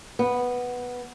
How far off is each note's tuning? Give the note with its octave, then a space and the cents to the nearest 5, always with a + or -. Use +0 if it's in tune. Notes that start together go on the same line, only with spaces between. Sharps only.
B3 -5